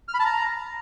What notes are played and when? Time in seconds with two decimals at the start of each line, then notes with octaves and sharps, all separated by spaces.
0.08 F6
0.14 B5
0.20 A5
0.25 A#5